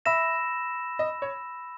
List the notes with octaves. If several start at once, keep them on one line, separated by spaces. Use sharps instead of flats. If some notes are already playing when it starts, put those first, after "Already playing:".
E5 B5 E6 A#6 E7
D#5
C#5